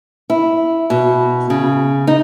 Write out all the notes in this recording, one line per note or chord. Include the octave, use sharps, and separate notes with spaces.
E4
B2
C#3
D#4